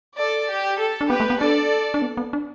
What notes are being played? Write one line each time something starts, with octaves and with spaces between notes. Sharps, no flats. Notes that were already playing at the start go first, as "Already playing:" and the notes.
A4 D5
G4
A4
D4
B3 G4 B4
A3
B3
D4 A4 D5
D4
B3
B3
D4